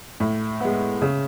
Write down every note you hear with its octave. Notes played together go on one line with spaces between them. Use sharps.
A2
G#3 B3
C#3